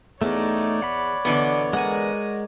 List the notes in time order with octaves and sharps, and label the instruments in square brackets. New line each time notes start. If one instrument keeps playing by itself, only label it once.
[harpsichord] E2 [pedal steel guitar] A3 D#4 [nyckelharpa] C#5 D5
[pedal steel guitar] F#5 B5
[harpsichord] B2 [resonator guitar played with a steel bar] D3 E3 B3
[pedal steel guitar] G#3 A#4 [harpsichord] F#5 G#5